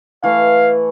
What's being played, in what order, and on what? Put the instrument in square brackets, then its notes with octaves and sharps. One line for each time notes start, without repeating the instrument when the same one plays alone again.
[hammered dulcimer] E3 A3 [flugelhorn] F5